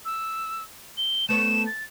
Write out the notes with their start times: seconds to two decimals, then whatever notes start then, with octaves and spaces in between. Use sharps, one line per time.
0.05 E6
0.98 G7
1.29 A3 B3 C#5 E7
1.67 A6